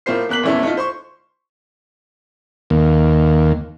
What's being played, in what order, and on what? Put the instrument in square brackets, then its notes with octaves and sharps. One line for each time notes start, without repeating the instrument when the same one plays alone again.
[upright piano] A2 A#3 F4 C5 C7
E2 A#3 F#6 B6 F#7
A#1 E2 E3 A3 C#4 E4
A3 D#4 F4
C5 C6 C#6
[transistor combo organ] D#2